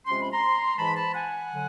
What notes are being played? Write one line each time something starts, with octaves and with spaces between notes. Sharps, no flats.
C3 F3 G#3 C#4 C6
B5
A#5 C6
G#2 E3 G#3 A5 B5
A5 B5
F#5 G#5
D3 F#3